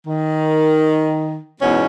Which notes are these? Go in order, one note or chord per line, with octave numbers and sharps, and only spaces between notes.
D#3
E2 G#2 B2 C#4